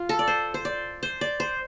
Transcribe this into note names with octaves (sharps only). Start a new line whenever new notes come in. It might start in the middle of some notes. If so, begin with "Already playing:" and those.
Already playing: F4
A4
D5
C5
C5
D5
C5
D5
C5